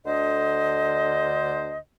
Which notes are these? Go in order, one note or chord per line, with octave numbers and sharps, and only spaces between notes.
D2 D3 C5 D#5